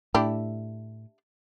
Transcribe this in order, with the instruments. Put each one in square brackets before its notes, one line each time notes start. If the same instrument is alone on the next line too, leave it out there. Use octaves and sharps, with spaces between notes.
[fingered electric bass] A2 [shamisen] D4 E4 G4